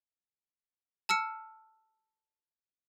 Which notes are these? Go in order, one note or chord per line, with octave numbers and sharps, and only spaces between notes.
A5 E6 F6 C#7